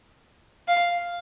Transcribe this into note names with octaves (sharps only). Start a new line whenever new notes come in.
F5